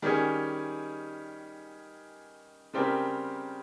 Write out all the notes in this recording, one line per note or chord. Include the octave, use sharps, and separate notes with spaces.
D#3 G3 C#4 G#4
C#3 G3 C4 G4 A#4